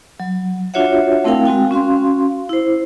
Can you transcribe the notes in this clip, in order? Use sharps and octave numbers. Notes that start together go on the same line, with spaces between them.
F#3
D4 F4 F#4 C#5 E5 F#5
A3 C4 E4 A#4 F5 G5
G#3 C4 F#4 G5
C#4 F#4 F5 C6
E4 C5